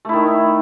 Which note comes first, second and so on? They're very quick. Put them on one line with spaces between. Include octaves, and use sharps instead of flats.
A3 E4 D#3